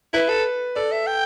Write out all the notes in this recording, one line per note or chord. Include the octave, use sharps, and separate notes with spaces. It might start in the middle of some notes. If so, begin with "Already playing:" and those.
E4 B4
A4
A4 D5
E5
G5